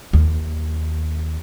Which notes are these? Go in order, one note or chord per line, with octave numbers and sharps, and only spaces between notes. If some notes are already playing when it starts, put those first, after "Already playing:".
D#2